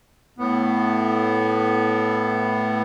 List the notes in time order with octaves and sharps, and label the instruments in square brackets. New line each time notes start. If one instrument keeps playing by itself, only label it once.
[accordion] A2 B3